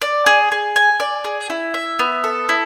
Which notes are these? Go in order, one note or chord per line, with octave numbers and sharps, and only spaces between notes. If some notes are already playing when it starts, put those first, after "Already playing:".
D5
G#4
G#4
G#5
D5
G#4
E4
E5
B3
A4
E4